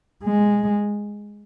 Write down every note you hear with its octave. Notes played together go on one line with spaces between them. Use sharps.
G#3